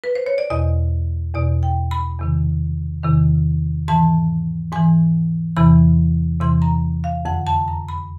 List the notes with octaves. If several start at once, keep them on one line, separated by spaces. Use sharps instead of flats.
B4
C5
C#5
D5
E2 B2 D#5
E2 B2 D5
G5
B5
E2 C3 D#3
E2 C3 D#3
G#2 E3 A5
G#2 E3 G#5
E2 C3 E3 B5
E2 C3 E3 C6
A#5
F5
F2 D3 F#5
A5
A#5
B5